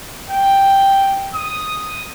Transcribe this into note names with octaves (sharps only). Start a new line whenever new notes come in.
G5
D#6